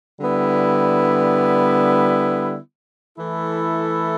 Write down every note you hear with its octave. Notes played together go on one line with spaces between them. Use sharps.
D3 G3 B3 E4
E3 A3 E4 A4